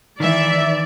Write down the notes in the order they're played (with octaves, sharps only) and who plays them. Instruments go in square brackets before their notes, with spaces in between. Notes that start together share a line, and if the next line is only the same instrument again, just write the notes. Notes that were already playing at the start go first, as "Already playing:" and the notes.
[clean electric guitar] D#3 [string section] E3 E5 [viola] D5